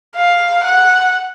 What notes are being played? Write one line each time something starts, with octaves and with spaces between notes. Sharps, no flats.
F5
F#5